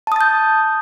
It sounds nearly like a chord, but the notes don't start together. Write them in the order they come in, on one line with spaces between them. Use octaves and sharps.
A5 D#6 A6 G6